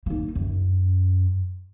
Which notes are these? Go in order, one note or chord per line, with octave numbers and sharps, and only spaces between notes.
A#3 D#4
F#2